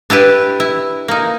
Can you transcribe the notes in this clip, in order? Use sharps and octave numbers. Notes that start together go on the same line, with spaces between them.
D4 E4 G4 B4
E4
A#3 D#4